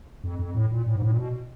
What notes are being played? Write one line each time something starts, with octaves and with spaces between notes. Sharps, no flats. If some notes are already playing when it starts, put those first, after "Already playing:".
F2
F2
A2
A#2
A2
G#2
A2
A#2
B2